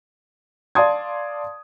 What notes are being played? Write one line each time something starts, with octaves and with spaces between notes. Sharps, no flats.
D5 F5 A5 C6 D#6 G#6